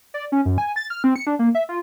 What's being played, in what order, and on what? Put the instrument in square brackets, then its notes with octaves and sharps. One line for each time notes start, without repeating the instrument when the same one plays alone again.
[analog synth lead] D5
C#4
F#2
G#5
A6
F6
C4
C#7
D4
A#3
E5
F4